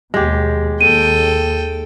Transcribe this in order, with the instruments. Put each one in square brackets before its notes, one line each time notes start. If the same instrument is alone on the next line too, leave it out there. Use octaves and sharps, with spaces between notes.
[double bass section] D#2 B2 [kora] G#3 G4
[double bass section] D#2 [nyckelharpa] A4 G5 [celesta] D#7